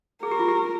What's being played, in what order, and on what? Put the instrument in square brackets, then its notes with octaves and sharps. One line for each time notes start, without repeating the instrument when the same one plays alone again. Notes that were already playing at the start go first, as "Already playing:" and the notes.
[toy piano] G#4 [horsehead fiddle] A#4
[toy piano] G4
F4
G4